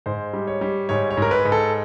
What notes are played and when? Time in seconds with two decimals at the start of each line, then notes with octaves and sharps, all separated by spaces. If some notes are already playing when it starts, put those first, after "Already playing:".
0.06 G#2 C5
0.33 G3
0.47 C#5
0.61 G3
0.89 G#2 C#5
1.11 C#5
1.17 G#2 A#4
1.31 B4
1.45 G#2
1.52 A4